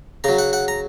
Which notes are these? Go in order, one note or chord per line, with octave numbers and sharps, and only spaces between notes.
C#3 F#3 A#5
F#5
F#5
A#5